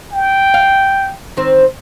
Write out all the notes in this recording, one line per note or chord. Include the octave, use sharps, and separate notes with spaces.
G5
F5
D#3 C4